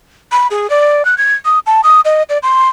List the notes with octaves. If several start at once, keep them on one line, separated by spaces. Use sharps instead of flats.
B5
G#4
D5
F#6
G#6
D#6
A5
D#6
D#5
D5
C6